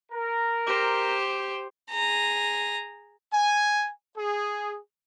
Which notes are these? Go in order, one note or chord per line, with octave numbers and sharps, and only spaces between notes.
A#4
G4 C5
G#4 A#5
G#5
G#4